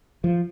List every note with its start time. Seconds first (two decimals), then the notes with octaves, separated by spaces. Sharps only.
0.24 F3